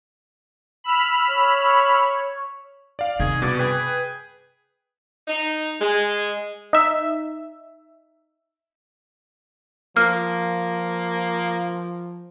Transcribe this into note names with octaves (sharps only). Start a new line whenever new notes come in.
B5 E6 F6
C#5
D5 F5
C3 D#3 G#4
G2 B2 D5
G#4 B4 G5
D#4
G#3
D#4 E5
F3 A#3 F6